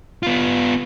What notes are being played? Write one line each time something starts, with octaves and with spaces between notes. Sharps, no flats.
B3 F4